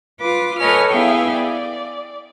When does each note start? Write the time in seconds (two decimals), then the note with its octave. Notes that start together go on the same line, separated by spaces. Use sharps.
0.20 F4 B4 D6
0.60 A4 B4 C#5 D#5 G#5 F6
0.92 B3 E4 G#4 E5 F5 G5
1.35 D5